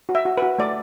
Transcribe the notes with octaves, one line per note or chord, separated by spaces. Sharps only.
F#4
E5
F#4
B4
F#4
A3 D5